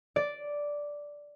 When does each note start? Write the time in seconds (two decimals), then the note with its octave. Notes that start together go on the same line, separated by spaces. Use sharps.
0.16 D5